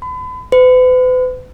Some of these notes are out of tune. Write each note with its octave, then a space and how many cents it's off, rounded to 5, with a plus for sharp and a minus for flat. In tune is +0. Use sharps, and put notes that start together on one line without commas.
B5 +40
B4 +40